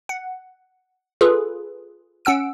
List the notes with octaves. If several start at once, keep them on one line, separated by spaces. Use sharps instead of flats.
F#5
F4 G#4 A4 B4
C#4 F#5 E6 D7